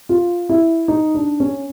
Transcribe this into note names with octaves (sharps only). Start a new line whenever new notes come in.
F4
E4
D#4
D4
C#4